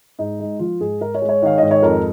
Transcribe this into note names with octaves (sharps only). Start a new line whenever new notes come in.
G#2 D#4
G#3
F3 F4
G#2 G#4
G#2 A#4
C#5
G#3
C#5
D#3 F5
G#2 D#5
C#5
F2 A#4